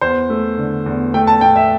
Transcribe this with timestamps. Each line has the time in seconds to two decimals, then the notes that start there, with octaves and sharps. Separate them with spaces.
0.01 E2 C5
0.30 A3
0.58 D3
0.86 E2
1.14 A3 G5
1.27 A5
1.41 A2 G5
1.56 E5